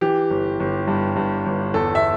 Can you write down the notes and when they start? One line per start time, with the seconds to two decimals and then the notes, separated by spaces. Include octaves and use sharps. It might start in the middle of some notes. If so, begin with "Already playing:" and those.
0.01 E3 G4
0.30 G1
0.60 G1
0.87 G2
1.16 G2
1.46 G1
1.74 E2 A4
1.95 E5